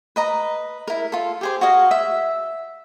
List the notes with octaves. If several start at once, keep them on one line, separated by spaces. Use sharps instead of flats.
B4 D#5 A#5
E4 A#4
F4 A4
G4 G#4 C5
F#4 G#4 D#5 F5
E5